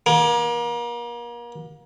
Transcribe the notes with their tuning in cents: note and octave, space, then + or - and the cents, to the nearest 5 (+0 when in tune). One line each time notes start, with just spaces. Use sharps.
A#3 +35